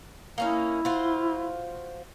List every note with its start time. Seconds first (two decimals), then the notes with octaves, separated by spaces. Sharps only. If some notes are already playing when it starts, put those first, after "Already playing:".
0.38 A#3 C#4 D#4 E4
0.85 F4 F#4 C5